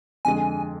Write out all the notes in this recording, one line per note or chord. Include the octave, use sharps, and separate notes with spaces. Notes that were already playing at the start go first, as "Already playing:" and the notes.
F2 D3 G#3 G#5